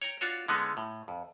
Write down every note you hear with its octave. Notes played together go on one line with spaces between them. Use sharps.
C#5 G5 A#5
D4 F4 F#4 C#5
D3 G#3 B3 C#4 D#4
A2
F2